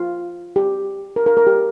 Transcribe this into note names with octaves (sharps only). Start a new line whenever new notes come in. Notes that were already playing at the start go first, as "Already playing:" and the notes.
Already playing: F4
G4
A#4
A#4
A#4
G4